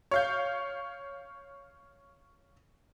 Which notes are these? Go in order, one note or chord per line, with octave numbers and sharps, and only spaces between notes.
C#5 F5 G6